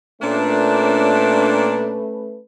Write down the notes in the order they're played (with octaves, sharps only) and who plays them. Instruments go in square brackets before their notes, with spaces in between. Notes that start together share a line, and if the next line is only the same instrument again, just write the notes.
[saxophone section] A#2 D4 [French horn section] A3 C#4 B4